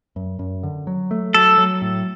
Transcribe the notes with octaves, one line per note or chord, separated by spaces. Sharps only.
F#2
F#2
D3
F#3
A3
F#3 A4
F#3
A2